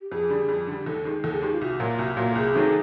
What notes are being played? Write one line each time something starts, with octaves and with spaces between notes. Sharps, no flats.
G4
F2 G#4
D3 G3
F2
D3 G3
D#2 A4
D#3 G#3
D#2 A4
G#4
D#3 G#3 G4
F4
C2 F#4
A#2 F#3 A#3
C2
A#2 F#3 A#3
A4
C2 G#4
C3 D#3 F#3 A3